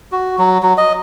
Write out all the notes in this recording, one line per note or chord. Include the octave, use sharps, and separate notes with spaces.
F#4
F#3
F#3
D#5